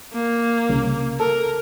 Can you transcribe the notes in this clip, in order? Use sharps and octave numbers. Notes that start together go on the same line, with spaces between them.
A#3
C2 C#3
A4 A#4